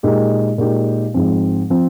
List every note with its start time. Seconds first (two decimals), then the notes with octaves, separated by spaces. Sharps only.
0.03 A#2 G#3 D#4 G4
0.58 A#2 G#3 D#4 G4
1.14 G#2 F3 C4
1.70 F3 C4